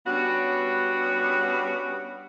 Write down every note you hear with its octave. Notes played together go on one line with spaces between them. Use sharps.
G3 B3 C#4 D4 F#4